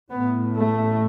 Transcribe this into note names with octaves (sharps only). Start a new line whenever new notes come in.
A1 A2 B3
A3